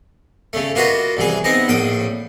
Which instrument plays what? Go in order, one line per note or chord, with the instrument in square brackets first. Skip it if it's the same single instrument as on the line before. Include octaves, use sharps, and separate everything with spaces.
[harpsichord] C#3 A3
A#3 F4 F#4 B4 D#5
C2 E3 G#4
B3 C4 D#4 D#5
A#1 A2 G5 D#6